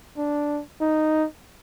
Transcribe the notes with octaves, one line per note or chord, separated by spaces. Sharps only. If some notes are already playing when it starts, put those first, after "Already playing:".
D4
D#4